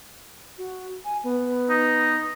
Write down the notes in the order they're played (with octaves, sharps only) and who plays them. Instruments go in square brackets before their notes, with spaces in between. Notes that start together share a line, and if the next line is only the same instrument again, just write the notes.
[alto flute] F#4
G#5
B3
[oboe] D#4